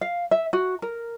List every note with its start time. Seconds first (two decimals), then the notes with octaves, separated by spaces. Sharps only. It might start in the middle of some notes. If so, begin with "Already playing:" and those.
0.01 F5
0.31 E5
0.53 F#4
0.82 A#4